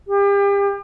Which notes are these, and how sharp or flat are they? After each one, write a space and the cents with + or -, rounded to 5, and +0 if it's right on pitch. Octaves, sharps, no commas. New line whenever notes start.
G4 +35